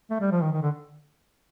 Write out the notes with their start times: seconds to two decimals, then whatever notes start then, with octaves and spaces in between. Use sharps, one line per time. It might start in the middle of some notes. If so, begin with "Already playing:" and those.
0.10 A3
0.20 G3
0.31 F3
0.41 D#3
0.52 D#3
0.62 D3